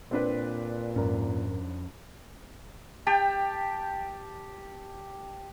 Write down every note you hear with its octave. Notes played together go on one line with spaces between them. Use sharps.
A#2 C4 D4 B4
F2 G#2 C#4 A#4
G4 G5 A5